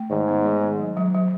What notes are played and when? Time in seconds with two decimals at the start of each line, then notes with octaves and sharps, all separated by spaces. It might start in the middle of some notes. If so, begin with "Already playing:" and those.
Already playing: A3
0.10 G#2 D#3
0.28 B3
0.45 D#3
0.62 B3
0.79 F#3
0.97 F#3
1.14 F#3